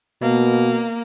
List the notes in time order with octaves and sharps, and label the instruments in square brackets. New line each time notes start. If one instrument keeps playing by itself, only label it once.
[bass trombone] B2 [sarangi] A#3